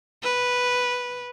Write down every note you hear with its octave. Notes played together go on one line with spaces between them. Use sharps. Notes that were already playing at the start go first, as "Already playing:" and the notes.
B4